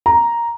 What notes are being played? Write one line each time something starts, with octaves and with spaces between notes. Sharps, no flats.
A#5